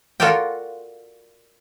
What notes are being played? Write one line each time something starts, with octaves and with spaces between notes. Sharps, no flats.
F4 F#4 A4 A#4 D5 G5